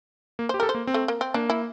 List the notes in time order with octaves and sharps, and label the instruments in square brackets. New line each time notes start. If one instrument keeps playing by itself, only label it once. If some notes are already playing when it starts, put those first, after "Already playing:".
[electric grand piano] A#3
[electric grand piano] G4 [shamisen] C5
[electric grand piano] A4 [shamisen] A#4
[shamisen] C5
[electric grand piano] A#3
C4
[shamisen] A3
A#3
C4
[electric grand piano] A#3 [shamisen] D4
[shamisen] E4